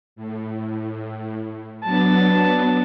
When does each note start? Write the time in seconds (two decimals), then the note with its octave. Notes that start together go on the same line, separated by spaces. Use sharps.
0.16 A2
1.84 F#3 B3 D4 A5